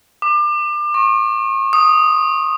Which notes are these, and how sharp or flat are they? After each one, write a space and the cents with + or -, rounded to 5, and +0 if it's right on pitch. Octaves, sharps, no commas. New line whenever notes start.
D6 +30
C#6 -35
D#6 +0